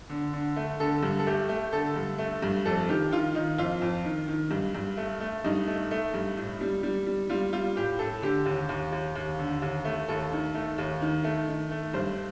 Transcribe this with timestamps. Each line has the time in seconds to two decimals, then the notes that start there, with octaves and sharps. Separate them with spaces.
0.10 D3
0.33 D3
0.56 A3
0.80 D3 A4
1.03 G2
1.19 A4
1.27 A3 G4
1.49 A3
1.72 D3 A4
1.96 G2
2.18 A3
2.42 G2
2.65 F2 A4
2.89 D#3 G4
3.11 D#3 F4
3.35 D#3 D#4
3.58 F2 F4
3.82 F2
4.04 D#3
4.28 D#3
4.51 G2
4.75 G2
4.97 A3
5.20 A3
5.44 G2 D#4
5.67 A3
5.91 A3
6.14 G2
6.37 A2
6.61 G3
6.83 G3
7.06 G3
7.29 G3 F4
7.53 G3 F4
7.76 A2 G4
7.99 A2 A4
8.22 D3 G4
8.45 D#2
8.69 D#2
8.92 D#2
9.15 D#2
9.39 D3
9.62 D#2
9.85 A3
10.08 D#2 A4
10.32 D#3
10.54 A3
10.78 D#2
11.01 D#3
11.24 A3
11.48 D#3
11.71 A3
11.94 G2 C5